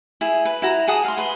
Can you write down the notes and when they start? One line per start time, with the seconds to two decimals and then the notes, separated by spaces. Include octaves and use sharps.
0.21 E4 G#4
0.45 B4
0.62 E4 F#4 A#5
0.87 G#4 F#5 A5 D#6
1.05 F5 C6
1.18 B4 C6